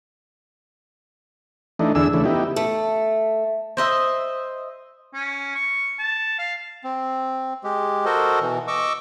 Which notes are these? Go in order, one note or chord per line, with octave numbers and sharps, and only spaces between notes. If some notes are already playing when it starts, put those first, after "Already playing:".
E3 A3 D4 D#4
E2 D3 D4 G#4 E6
C#3 E3 A3 D4
B3 D#4 E4 G4
A3
C5 D#5 E5
C#4
C#6
A5
F5
C4
G#3 G4
F#4 A4 A#4 C5 D#5
B2 E3
D#5 C#6 D6 E6